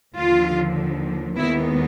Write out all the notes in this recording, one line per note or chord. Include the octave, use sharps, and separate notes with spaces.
D#2 D3 F3 F4
D#2 D#3 G#3 B3 E4